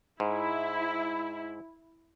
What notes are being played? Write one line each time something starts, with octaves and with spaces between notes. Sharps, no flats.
G#2 E4